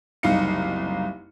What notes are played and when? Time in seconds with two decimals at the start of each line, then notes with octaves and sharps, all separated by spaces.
0.23 F#1 C2 D#4 F5 C#7